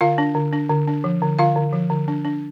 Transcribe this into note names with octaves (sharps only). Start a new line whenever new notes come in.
D3 F4 F5
D4
D3
D4
D3
D4
F3
D3
D3 F4 F5
D3
F3
D3
D4
D4